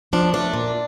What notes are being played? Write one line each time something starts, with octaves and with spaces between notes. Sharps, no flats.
F3 D4
A3 D4
A#2